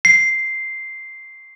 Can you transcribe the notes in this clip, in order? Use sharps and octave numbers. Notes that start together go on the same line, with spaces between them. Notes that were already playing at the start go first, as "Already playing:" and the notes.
C7